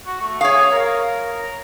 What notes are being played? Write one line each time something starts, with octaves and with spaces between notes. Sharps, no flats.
F#4
A3
G#4 C#5 F5
A#4